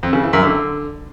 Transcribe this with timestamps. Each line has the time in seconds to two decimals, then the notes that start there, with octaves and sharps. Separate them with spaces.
0.03 F2
0.13 C#3
0.23 E3
0.33 F#2
0.43 D3